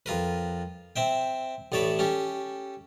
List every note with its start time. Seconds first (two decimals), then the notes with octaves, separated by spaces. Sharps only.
0.06 F2 F4 A#4 B4
0.96 C4 E5 G5
1.72 A1 A2 C#5 D5 A5 B5
1.99 C#4 G4 A4